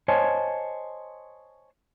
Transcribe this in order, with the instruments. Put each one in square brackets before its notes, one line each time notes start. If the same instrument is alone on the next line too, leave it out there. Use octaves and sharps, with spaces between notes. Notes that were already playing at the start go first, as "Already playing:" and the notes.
[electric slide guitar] C5 C#5 D#5 G#5 A5